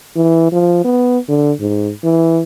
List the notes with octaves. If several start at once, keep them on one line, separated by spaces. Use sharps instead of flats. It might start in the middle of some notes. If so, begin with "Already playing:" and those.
E3
F3
B3
D3
G#2
E3